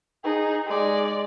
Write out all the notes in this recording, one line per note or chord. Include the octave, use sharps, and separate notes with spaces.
D#4 G#4
G#3 D5